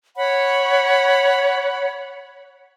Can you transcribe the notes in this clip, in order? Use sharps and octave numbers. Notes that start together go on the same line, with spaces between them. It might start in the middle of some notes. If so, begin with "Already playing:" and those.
C#5 F#5 B5